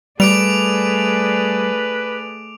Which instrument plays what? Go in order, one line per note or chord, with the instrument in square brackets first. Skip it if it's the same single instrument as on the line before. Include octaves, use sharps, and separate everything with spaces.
[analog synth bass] G3 [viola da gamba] A3 G#4 D5 [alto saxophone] B4 [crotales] D6 D7 F7